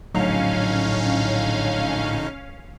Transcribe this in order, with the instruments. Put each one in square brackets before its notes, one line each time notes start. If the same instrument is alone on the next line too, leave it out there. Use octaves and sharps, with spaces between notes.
[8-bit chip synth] A#1 D3 D#4 [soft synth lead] A2 [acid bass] F#3 [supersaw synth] C#4 F5